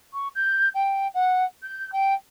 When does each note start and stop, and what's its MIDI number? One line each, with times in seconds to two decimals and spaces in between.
0.14 0.28 85
0.35 0.69 91
0.75 1.08 79
1.14 1.44 78
1.63 1.92 91
1.93 2.14 79